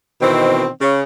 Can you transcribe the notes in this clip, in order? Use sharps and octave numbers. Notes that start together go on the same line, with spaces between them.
B2 D#3 E3 C4
C#3